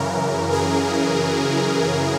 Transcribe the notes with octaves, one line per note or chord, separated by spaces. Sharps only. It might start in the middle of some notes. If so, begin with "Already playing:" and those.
Already playing: F#2 C#3 E3 A#4
G#4